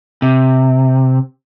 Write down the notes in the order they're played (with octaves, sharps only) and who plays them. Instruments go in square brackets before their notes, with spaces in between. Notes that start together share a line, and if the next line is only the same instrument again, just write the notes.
[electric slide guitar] C3